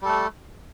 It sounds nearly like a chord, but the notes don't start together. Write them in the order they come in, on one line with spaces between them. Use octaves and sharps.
G3 A4 A3